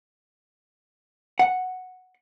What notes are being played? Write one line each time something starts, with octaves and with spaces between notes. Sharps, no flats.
F#5